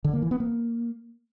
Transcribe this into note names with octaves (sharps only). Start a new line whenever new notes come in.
D3
A#3
E3
B3
A#3